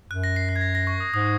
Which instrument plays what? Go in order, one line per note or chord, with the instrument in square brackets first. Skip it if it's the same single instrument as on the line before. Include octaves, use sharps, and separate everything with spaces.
[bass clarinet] F#2 [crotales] F#6
[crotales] A#6
C7
A#6
G#6
A#6
A#6
C#6
D#6
[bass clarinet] G#2 [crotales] D#6